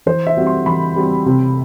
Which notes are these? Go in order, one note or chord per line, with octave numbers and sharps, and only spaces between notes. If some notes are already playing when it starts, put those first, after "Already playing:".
E3 C5
E5
G3 C4 F#4
C6
E3 B5
G3 C4 F#4
C3